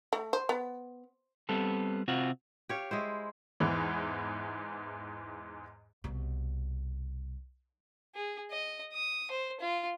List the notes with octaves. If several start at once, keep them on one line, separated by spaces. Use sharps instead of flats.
A3
C5
B3
G3 B3 C4 A4
C3 C4 F4 F#4
G4 C#5 F5
G#3 E4 C5
E2 G#2 E3
C2 B2
G#4
D#5
D#6
C5
F4